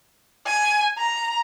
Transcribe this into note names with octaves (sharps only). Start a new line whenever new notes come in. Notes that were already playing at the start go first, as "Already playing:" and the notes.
G#5
A#5